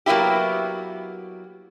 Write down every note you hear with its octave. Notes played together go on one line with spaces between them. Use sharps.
F#3 A#3 B3 E4 G4